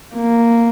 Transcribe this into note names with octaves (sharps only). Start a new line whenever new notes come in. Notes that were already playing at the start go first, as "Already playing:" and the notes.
A#3